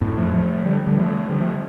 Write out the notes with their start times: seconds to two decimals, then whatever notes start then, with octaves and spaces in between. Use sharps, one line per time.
0.01 F2 A2
0.17 F3 A3
0.34 F3 A3
0.66 D3 G3
0.87 D3 G3
0.97 F3 A3
1.30 D3 G3
1.40 F3 A3